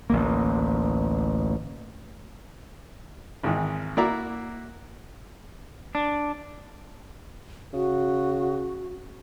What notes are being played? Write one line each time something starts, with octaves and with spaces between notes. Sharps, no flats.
A1 D2 A#3
G#1 G#2 D#3 E3
A#3 E4 F#4 D5 E5 A#5
D4
C#3 F#4